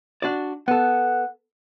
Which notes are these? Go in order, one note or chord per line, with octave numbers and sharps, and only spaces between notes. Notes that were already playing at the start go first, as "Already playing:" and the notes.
D4 F#4 D5
B3 A4 F#5